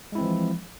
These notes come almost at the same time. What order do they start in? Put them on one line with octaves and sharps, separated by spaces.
G#3 E4 C4 E3 F3